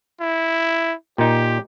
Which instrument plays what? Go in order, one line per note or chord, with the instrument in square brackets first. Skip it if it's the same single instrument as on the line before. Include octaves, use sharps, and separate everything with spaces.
[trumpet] E4
[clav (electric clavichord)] A#2 D#4 [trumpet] G4